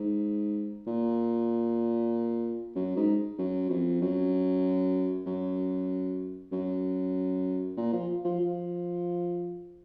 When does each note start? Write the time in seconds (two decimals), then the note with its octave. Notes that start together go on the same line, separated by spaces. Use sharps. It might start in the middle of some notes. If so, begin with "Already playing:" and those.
Already playing: G#2
0.87 A#2
2.75 F#2
2.96 G#2
3.38 F#2
3.70 F2
4.01 F#2
5.26 F#2
6.52 F#2
7.77 A#2
7.93 F3
8.25 F3
8.40 F3